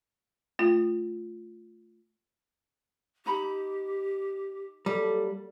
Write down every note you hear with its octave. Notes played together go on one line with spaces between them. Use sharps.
A3 F4
D#4 G4 A#5 B5
F#3 G3 A#3 A4